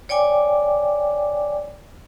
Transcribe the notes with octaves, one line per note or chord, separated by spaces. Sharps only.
C#5 D5 G5 G#5 D6